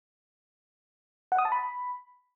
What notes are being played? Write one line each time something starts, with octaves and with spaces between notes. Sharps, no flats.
F#5
D#6
A5
B5